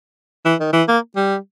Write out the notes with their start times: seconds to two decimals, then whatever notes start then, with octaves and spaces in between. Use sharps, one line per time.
0.45 E3
0.60 D#3
0.73 E3
0.88 A#3
1.16 G3